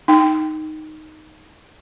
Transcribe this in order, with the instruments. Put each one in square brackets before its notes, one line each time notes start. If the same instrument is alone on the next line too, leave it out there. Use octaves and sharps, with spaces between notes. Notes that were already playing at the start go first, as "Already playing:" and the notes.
[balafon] D#4 G5